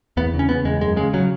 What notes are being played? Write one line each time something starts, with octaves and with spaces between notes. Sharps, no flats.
E2 B3
C#3
C#4
C#3 B3
E2 G#3
F#2 G#3
C#3 G#3
C#3 F#3